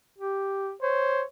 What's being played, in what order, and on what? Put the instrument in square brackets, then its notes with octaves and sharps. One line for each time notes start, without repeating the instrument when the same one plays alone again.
[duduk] G4
[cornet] C5 [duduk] C#5